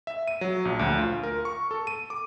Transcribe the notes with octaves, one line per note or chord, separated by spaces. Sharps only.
E5
D#7
F#3
A#1
D2
F4
A#4
C#6
A4
D#7
D6